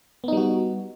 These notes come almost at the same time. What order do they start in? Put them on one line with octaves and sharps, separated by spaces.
B3 D#4 G3 F#4